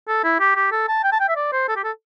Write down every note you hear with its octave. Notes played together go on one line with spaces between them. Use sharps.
A4
E4
G4
G4
A4
A5
G5
A5
G5
E5
D5
C5
A4
G4
A4